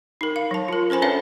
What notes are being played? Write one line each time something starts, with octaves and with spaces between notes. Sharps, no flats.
D#4 A#4
F5
F#3 A5
F4 A#4
C#4 A4 C5 G#5 B5
C#4 D4 B4 C#5 E5 F#5